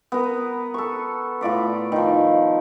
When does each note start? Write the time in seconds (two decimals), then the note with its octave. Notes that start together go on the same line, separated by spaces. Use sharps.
0.12 B3 A#4
0.74 A4 C#6
1.41 A2 F4 D5 B5
1.92 D#3 F3